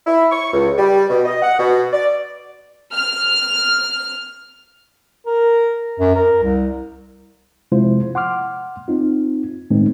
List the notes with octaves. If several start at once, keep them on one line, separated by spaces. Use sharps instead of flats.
E4
C#6
C#2
G3
B2
D#5
F#5
B2
D5
F6
A#4
F#2
A#4
C2
C3 F3 G#3 E4 F4 C5
F#5 C6 D6 F6
C4 D#4 F4
A2 D#3 G#3 B3 C4 D#4